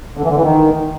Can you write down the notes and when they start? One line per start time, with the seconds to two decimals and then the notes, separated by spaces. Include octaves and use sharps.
0.17 D3
0.24 E3
0.30 D3
0.37 E3
0.44 D#3